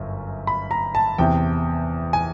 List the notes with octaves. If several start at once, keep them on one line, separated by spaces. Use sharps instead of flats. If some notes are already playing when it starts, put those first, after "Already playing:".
Already playing: G1 F#2
B5
A#5
A5
E2 C3 E3 G5
G#5